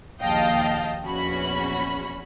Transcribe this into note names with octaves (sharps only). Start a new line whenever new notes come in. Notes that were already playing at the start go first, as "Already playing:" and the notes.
A#1 D#2 D#5 F5 G5 A5
A#1 E2 C#4 F#4 B5